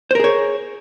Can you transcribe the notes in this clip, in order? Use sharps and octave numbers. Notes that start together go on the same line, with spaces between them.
G#4 A#4 C5 C#5